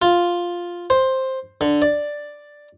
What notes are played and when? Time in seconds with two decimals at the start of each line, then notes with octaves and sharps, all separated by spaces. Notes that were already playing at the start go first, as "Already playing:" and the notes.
0.02 F4
0.90 C5
1.61 D3
1.82 D5